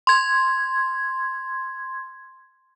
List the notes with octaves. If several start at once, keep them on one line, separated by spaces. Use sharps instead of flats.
C6 G#6